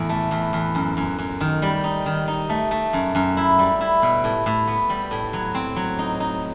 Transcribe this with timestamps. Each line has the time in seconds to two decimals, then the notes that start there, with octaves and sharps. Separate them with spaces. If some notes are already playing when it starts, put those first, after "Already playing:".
Already playing: E2 A2
0.09 A3
0.31 E2
0.53 E2
0.75 F#2
0.97 F#2
1.19 F#2
1.41 D#3
1.62 G3
1.84 D#4
2.06 D#3
2.28 D#4
2.49 A3
2.71 A3
2.93 F#2
3.15 F#2
3.37 E4
3.59 G3
3.81 E4
4.02 B2
4.24 A2
4.46 A2
4.68 B3
4.90 G3
5.11 A2
5.33 F#3
5.55 C4
5.76 F#3
5.99 D#4
6.20 D#4